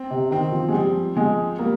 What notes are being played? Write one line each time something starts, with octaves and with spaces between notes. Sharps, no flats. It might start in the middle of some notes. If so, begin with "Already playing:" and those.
Already playing: C4
C3
D#3 C4
F3
G#3
F3 G3
F3 G#3
G3 A#3